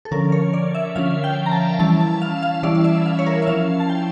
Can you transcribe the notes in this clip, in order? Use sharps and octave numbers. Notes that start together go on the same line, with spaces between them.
A4
D3 F3 C#4 A#4
C#5
D5
E5
D3 F3 C#4 F5
G5
A#5
A5
E3 G3 C#4 E4 A5
A5
F5
F5
E3 G3 C#4 E4 D5
D5
E5
F5
C#5
A#4
E5
F3 C#4 E4 F5
A5
G5